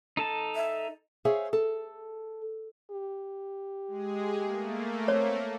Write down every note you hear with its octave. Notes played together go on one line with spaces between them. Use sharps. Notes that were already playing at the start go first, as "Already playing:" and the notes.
D#4 A4 A5
E5
G#4 C5 C#5 E5 F5 G#5
A4
G4
G#3 G#4
A3 A#3
C4 C#5